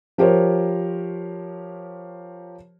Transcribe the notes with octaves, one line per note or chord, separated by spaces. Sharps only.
F3 G4 A#4 C5 C#5